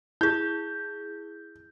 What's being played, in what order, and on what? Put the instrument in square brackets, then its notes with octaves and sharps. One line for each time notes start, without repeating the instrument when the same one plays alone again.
[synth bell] E4 G#4 [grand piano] G6